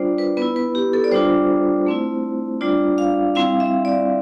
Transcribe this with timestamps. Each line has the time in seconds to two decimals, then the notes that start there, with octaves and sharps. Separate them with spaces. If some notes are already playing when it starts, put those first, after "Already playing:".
Already playing: G3 D4 F4 C5 D5
0.18 B4
0.37 B3 E4 B4
0.56 B4
0.75 G4
0.93 A4
1.04 D5
1.11 G3 D4 F4 C5
1.86 A3 C4 E4
2.61 G3 D4 F4 D5
2.98 F5
3.35 G3 C4 E4 F5
3.60 E5
3.85 D5